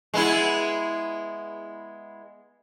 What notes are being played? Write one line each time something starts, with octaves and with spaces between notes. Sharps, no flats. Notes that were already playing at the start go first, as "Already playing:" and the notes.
G#3 B3 E4